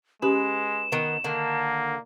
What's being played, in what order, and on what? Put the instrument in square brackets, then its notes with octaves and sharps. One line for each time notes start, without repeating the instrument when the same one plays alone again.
[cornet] G#3 [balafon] C#4 G4 [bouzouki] B4 [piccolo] E7
[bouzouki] D#3 B3
[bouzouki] D3 D#3 [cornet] A#3